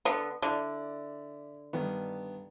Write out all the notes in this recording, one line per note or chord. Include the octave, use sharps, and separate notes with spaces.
D3 B3
D3 E4 D5
G2 D#3 B3